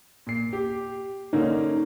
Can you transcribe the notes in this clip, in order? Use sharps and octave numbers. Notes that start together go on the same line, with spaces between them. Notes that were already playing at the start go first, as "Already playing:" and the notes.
A#2 C7
G4
D3 A#3 C#4 D#4